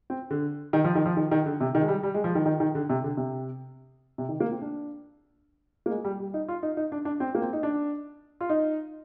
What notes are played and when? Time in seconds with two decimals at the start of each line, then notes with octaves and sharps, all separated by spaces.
0.10 C4
0.31 D3
0.73 D#3
0.84 F3
0.95 D#3
1.06 F3
1.17 D#3
1.31 D#3
1.46 D3
1.61 C3
1.75 D#3
1.82 G#3
1.88 G3
2.03 G3
2.14 G#3
2.24 F3
2.35 D#3
2.46 D#3
2.60 D#3
2.75 D3
2.90 C3
3.04 D3
3.17 C3
4.18 C3
4.29 D#3
4.40 A#3
4.51 C4
4.62 D4
5.86 A#3
5.90 G#3
6.05 G3
6.20 G3
6.34 D#4
6.48 F4
6.63 D#4
6.77 D#4
6.92 D4
7.05 D4
7.20 C4
7.35 A#3
7.42 C4
7.53 D#4
7.63 D4
8.41 F4
8.49 D#4